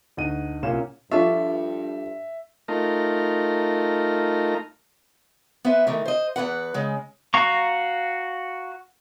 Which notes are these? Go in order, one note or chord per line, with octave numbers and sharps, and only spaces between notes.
D2 D#4 F#5 D#7
C2 A#2 C#4 F5 E7
G2 F3 D4 F4 A4 E5 C#6
A3 D#4 F4 A#4
B3 B4 C5 E5
D#3 E3 A3
C5 D#5
E2 F3 B4 F#5
C#3 G#3
F#4 F5 A#5 C#6